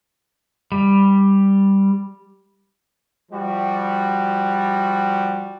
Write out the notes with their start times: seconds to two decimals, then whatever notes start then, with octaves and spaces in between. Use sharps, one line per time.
0.72 G3
3.32 F3 G3 F#4